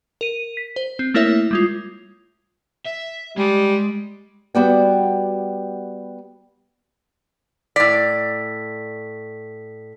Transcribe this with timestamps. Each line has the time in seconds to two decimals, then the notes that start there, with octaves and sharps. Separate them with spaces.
0.21 A#4 D#7
0.57 B6
0.76 C5
0.99 C4
1.14 A3 A#3 E4 A#4 C#5 E5
1.51 G3 G#3 F4
2.86 E5
3.38 G3 G#3
4.55 G3 B3 F#4 D5 F#5 G5
7.76 A2 D5 B6